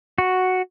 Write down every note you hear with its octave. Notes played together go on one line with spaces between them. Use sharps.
F#4